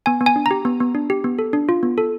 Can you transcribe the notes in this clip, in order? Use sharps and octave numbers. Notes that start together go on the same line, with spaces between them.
B3 G#5
B3
G#5
D4
G4 A#5
B3
B3
D4
G4
B3
A4
D4
F4
B3
A4